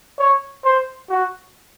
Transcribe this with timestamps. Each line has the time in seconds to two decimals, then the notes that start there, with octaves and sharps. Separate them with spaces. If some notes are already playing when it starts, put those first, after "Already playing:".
0.19 C#5
0.65 C5
1.10 F#4